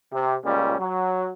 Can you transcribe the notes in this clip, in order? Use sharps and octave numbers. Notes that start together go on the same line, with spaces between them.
C3
C#2 A#2 G3 C#4
F#3